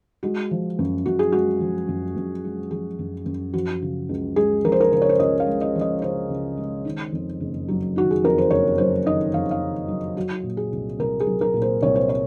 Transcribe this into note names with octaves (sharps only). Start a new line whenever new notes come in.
G#3 F#4
F3
F#2
F#2 F#4
G#4
G#3 F#4
F3
F#2
F#2
G#3
F3 G#4
F#2
F#2
F3 F#4
C#3
C#2
G#3 G#4
F3 A#4
C5
A#4
C#3 C5
C#5
C5
C#2 D#5
F5
G#3
D#5
F3
D#5
C#3 C5
C#2
G#3
D#3
F2
F#1
F#3
D#3 F#4
G#4
F2 A#4
C5
F#1 C#5
F#3 C5
D#3 D#5
F2 F5
F5
F#1
F#3
F#3 F#4
A#2
G#4
C2
C2 A#4
G#4
F#3
A#4
A#2
C5
C2 C#5
C5
C#5